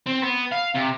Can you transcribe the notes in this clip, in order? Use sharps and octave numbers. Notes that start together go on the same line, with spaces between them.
C4
B3
F5
C3